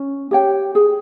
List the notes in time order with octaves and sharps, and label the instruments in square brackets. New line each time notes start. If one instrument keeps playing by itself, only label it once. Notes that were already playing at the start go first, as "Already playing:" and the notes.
Already playing: [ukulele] C#4
G4 C#5 G5
G#4